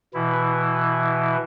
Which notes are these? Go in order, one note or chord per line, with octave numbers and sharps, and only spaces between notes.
B2 E3 E4